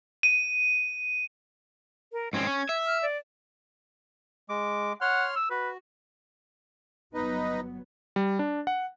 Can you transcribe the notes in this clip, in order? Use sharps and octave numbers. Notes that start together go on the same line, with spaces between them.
D#7
A#4
G#2 C4 C#4 G#6
C#4
E5
F6
D5
G#3 D6
C#5 F#5 C6 F6
E6
F#4 B4
G1 F#3 B3 D#4 B4 D#5
G3
D4
F#5